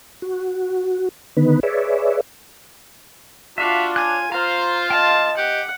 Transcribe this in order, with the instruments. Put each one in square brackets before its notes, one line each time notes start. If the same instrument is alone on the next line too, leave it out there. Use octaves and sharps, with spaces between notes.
[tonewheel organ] F#4
D3 D#3 B3 D#4 B4
G#4 B4 C#5 D5 E5
[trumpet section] D4 [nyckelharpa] F4 [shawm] F#4 [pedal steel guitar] E5 F5
[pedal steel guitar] C#5 F#6 [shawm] G#5
[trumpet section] F4 [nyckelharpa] C5 [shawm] F5 [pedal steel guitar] A#5
[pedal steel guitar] D#5 G5 [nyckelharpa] A5
[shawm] G4 [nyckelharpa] F#5